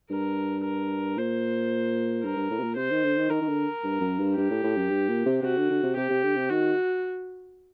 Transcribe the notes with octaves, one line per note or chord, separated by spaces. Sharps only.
G2 A#4
A#4
A#2 C5
G2 A#4
G2
A2
C3
A#2
C3 C5
D#3
D3
D#3
D#3 A#4
D#3
D3
G2
F#2
G2
G2 G4
A2
A2
F#2
G2
A#2
C3
C3 F#4
D3
D3
C3
C3 G4
C3
D3
C3
D#3 F#4